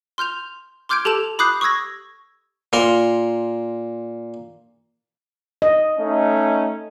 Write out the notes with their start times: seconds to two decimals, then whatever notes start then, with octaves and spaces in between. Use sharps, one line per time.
0.18 C6 F6 G6 F7
0.89 C6 D6 F6 G6 G#6 D7
1.05 G4 A4 A5 E7 F7
1.39 B5 D6 D#6 F#6 G6 C7
1.61 C#6 D#6 E6 G#6 A#6
2.73 A#2 A#4 C6
5.62 D#5
5.99 A3 C#4 D#4